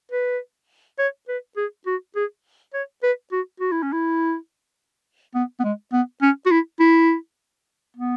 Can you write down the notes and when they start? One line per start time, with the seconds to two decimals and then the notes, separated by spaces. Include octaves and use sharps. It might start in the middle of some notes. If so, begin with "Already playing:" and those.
0.12 B4
0.99 C#5
1.28 B4
1.57 G#4
1.86 F#4
2.16 G#4
2.74 C#5
3.03 B4
3.32 F#4
3.60 F#4
3.72 E4
3.82 C#4
3.92 E4
5.34 B3
5.60 B3
5.64 G#3
5.92 B3
6.22 C#4
6.46 F#4
6.51 E4
6.80 E4
7.96 B3